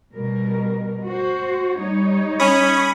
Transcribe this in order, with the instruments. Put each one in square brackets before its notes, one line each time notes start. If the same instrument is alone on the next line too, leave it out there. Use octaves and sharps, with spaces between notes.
[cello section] B2 G3 A#4
F#4 C5
G3 D#4 C#5
[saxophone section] C#4 [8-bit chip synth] B5 C#6 D#6